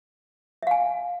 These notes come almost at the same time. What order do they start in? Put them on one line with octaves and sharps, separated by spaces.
E5 F5 G#5